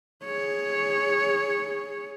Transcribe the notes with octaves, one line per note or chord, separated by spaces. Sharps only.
G#4 C#5